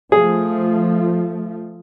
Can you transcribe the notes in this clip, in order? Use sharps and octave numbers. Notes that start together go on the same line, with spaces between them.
F3 A3 G#4